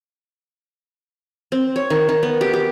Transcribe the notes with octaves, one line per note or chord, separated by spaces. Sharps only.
C4
C#5
D#3
D#3
B3
G4
G4